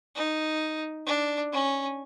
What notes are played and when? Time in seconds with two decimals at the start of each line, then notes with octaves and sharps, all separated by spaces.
0.16 D#4
1.07 D4
1.53 C#4